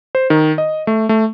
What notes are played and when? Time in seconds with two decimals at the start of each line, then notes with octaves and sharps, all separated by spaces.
0.15 C5
0.30 D#3
0.58 D#5
0.87 A3
1.09 A3